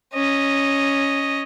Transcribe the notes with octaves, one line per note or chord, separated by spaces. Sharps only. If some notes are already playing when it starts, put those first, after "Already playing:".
C#4 D#5